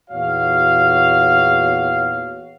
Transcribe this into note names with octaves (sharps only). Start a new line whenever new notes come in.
E2 A#2 F#4 C#5 F5